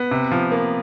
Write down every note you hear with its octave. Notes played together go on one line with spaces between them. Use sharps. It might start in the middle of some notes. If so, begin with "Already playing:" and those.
Already playing: B3
C3
F3
A#3